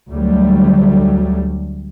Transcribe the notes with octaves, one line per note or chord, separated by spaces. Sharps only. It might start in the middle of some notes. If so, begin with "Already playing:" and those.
D2 F#3 G3 A3